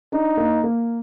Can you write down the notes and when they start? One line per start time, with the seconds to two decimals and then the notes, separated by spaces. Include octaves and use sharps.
0.12 D4 D#4
0.37 A#3
0.64 A#3